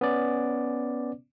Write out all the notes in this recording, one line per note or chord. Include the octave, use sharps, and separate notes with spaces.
B3 C#4 D5